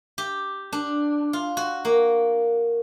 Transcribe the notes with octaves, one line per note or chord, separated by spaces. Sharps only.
G4
D4
F4
F#4
A#3